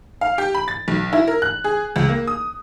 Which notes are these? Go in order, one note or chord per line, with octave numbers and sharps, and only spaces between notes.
F5
G4
B5
A6
B1
E4
A#4
F#6
G#4
C#2
A#3
D#6